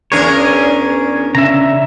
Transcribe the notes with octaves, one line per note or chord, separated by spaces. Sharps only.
E2 C#4 D4 G#4 A#4 C#5
C#3 E5 A#5